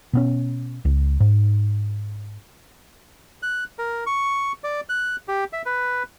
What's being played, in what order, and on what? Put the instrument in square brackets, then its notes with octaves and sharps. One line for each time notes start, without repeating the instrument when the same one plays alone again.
[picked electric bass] B2 B3 C#4
C#2
G#2
[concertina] F#6
A#4
C#6
D5
F#6
G4
E5
B4